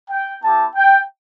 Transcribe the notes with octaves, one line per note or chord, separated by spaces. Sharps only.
G5
B3 E4 G4 A5
G5